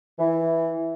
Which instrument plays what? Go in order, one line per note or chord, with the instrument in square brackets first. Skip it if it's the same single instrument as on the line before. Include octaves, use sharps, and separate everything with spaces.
[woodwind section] E3